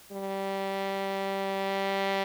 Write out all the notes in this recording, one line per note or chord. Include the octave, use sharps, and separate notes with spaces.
G3